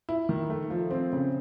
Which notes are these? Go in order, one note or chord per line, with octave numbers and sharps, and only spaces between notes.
E4
D#3
A3
F3
C4
C#3